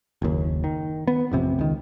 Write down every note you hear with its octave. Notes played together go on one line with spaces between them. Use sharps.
F#1 D#2
D#3
B3
A1 F2 C3
C#2 D#3